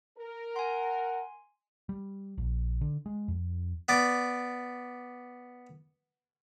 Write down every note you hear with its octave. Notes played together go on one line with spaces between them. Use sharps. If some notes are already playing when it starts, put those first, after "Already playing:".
A#4
F#5 G#5 C6
G3
A#1
D3
G#3
F2
B3 D5 D6